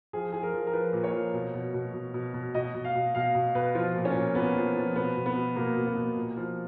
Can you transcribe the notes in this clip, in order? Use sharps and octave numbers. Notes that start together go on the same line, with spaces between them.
F3 G#4
F3 G#4
A#4
F3
A#4
F3 B4
A#2
C#5
F3
B2
B2
B2
B2
B2
B2
B2 D#5
B2
F5
B2
B2 F5
B2
B2 B4
F3 F4
A#2
C#4
A#2
A#2 B3
F3
F3
B2 B3
B2
B3
B2
B2 A#3
B2
B3
B2
A#2
F3